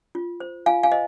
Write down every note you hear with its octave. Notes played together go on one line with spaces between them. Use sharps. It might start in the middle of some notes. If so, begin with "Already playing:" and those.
F4
C5
F4 F5 G#5
F5 G#5
C5 D#5